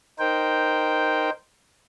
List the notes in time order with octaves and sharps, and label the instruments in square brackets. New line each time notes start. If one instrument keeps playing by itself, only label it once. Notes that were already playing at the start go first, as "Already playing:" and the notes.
[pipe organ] D#4 A#4 C5 G5